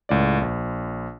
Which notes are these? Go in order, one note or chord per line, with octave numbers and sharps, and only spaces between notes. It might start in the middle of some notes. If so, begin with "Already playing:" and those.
C#2 A2 D5
A#1